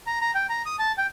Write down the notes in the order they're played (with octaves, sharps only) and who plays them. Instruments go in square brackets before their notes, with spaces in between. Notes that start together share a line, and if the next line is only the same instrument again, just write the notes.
[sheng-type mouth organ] A#5
A#5
G5
A#5
D#6
A5
G5